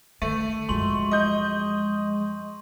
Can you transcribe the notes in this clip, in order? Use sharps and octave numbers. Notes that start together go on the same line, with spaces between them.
D#3 A3 D#7
F#2 F3 G#3 C6 C#6 F#7
D#5 G6